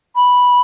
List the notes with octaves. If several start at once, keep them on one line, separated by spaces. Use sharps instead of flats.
B5